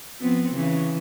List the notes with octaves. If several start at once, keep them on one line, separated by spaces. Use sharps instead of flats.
F3 B3 C4
C#3 E3